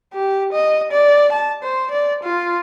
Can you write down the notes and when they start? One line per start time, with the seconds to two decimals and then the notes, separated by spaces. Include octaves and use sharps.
0.13 G4
0.53 D#5
0.91 D5
1.32 A5
1.63 C5
1.91 D5
2.23 F4